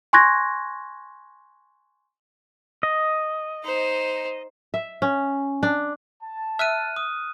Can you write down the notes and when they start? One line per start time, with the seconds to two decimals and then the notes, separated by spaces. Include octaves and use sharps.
0.13 G#5 C6 C#6 F#6 G#6 A#6
2.83 D#5
3.64 D#4 C5
4.74 E5
5.02 C#4
5.63 D4
6.23 A5
6.59 E5 F6 F#6 D#7
6.96 D#6